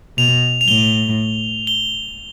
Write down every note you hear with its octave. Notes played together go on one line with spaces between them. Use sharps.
B2 F7
F7
A2 G7
G7